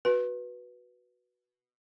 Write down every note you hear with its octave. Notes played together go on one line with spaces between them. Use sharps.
F#4 B4